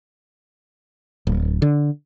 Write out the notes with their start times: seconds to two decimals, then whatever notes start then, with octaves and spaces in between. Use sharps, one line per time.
1.27 D1
1.62 D3